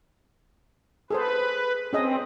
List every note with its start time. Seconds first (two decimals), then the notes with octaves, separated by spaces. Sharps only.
1.10 G#4 A4 B4 C5
1.93 C4 C#4 G#4 D#5